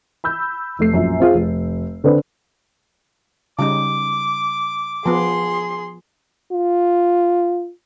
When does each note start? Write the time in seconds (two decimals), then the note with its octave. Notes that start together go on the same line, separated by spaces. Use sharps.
0.24 B5 E6 G6
0.79 F1 A3 C7
0.94 A#1 F#2
1.20 C4 F4 G#4
1.34 F1
2.04 D3 C4 D4 B4
3.59 C#3 G3 D#4 D6
5.06 F3 B3 G#4 C6
6.53 F4